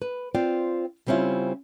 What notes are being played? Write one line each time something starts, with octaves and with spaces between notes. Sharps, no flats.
B4
C4 F4 D5 G5
C#3 G3 C4 C#4 E4 F4